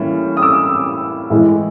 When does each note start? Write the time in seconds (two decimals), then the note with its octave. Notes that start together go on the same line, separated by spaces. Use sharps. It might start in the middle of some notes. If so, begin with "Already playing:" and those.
Already playing: A2 E3 G3 A#3 C#4
0.37 D#6
0.42 D6 E6
1.30 A2 E3 G#3